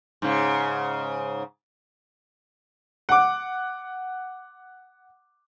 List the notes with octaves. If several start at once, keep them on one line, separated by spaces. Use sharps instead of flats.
G#2 C#3
F#5 D6